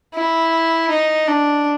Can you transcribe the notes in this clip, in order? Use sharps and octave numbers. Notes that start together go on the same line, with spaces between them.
E4
D#4
D4